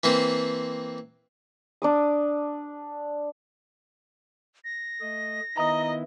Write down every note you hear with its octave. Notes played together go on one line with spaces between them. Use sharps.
E3 A#3 C4
D4 D6 D#6
A#6
A3 D#5
D#3 B3 E4 D#5 A#5 D#6